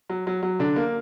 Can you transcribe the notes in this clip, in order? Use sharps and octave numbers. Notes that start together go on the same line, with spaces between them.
F#3
F#3
F#3
D3 D4
A#3